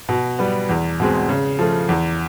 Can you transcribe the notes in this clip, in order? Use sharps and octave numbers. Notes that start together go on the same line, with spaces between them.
B2
G3 B3
E2
B2 G#3 C4
C#3
F3 A3
E2